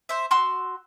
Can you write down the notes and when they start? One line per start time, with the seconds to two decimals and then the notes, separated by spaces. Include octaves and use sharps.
0.09 C5 E5
0.31 F#4 C6 E6